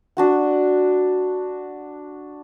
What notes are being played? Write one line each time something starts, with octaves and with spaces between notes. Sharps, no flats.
D4 F#4 F#5